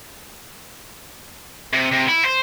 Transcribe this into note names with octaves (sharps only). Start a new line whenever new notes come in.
C3
C3
E4
C5